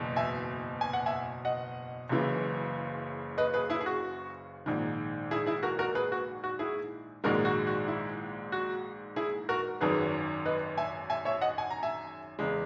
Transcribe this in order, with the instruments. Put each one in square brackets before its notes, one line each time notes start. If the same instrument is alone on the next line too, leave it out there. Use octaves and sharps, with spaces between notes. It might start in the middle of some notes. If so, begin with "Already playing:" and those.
Already playing: [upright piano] F#1 E2 B2
E5 G#5
G#5
F#5
E5 G#5
D#5 F#5
F#1 F#2 C#3 E3
B4 D#5
G#4 B4
E4 G#4
G#4
F#4
A#1 G#2 D#3
E4 G#4
E4 G#4
F#4 A#4
F#4 A#4
G#4 B4
F#4
F#4
E4 G#4
A#1 G#2 D#3 G#3 F#4 A#4
F#4
F#4
E4
F#4
E4 G#4
F#4 A#4
G#1 F#2 D#3 G#4 B4
B4 D#5
E5 G#5
E5 G#5
C#5 E5
D#5 F#5
G#5
A#5
E5 G#5
E2 C#3 G#3